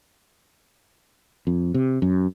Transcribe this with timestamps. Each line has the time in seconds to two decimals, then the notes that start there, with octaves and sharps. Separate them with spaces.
1.47 F2
1.74 C3
2.02 F#2